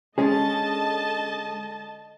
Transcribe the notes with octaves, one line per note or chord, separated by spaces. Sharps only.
D3 G#3 C#4 G#4 D#5 A5